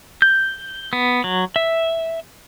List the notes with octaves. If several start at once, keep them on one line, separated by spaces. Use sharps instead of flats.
G6
B3
F#3
E5